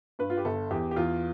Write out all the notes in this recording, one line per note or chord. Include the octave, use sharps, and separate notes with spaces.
G2 B4
F4
G4
G1 A4
E2 G4
G4
E2 F4